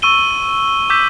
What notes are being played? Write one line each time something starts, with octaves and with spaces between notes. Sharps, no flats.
C#6 E6 D#7 G7
D6 E6 G6 B6